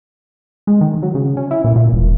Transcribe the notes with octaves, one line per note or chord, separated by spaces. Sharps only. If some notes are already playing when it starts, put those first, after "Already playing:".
G#3
D#3
F#3
C#3
C#4
E4
A#2
A#2
E1